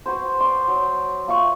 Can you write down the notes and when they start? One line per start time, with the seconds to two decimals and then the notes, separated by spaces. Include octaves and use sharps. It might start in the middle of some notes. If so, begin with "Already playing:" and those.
0.06 F#4 B4 C5
0.40 D5 C6
0.68 F#3
1.28 A#3 F4 E5 C#6